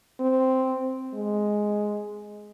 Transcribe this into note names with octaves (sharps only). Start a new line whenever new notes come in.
C4
G#3